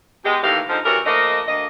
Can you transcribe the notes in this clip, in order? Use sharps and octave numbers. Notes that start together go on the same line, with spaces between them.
B2 G#3 G4
A2 D#3 E3 A#3 G4 F5
D3 F3 G#3 D#4 C5
E3 G3 C#4 F#4 A#4
F3 A3 A#3 D#5
D2 A#3 D#5